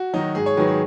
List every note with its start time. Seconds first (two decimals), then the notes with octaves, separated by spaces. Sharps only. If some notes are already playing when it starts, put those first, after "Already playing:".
Already playing: F#4
0.13 D#3 F#3 D#4
0.35 G#2 G#4
0.46 C#5
0.57 D#3 F#3 B4
0.68 G#4